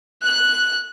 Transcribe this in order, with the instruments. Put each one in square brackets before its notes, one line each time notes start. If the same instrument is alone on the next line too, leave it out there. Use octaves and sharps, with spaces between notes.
[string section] F#6